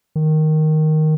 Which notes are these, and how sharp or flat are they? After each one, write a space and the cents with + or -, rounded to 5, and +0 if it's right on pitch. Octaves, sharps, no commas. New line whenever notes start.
D#3 +0